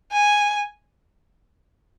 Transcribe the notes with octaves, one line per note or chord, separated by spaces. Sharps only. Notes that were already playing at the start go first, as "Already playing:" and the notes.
G#5